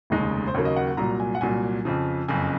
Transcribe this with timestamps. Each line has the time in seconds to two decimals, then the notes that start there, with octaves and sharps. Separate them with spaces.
0.10 F1 D#2 C#3 G#3 D#4
0.47 C5
0.54 D#2 C#3 F#3 A#3 C#5
0.65 D#5
0.76 F#5
0.87 F#5
0.97 C2 A#2 F#3 A#5
1.20 G#5
1.35 F#5
1.41 C2 A#2 F#3 G#5
1.85 F2 C#3 F3
2.28 F#1 F2 C#3 G#5